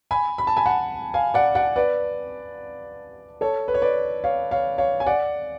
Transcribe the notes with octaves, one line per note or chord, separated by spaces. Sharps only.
G#5 B5
B5
A5
G#5 B5
F#5 A5
F5 G#5
D5 F#5
D5 F#5
B4 D5
A4 C#5
B4
C#5
B4 D5
C#5 F5
C#5 F5
C#5 F5
G#5
D5 F#5